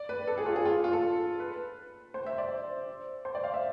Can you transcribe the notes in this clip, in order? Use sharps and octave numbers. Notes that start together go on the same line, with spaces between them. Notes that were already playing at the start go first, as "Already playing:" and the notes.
Already playing: D5
B4
A4
G#4
F4
G#4
F4
F4
A4
B4
C5
E5
D5
C5
D5
F5
E5